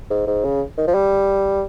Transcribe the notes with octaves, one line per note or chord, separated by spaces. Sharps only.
G#2
G#2
C#3
D#3
F3
G3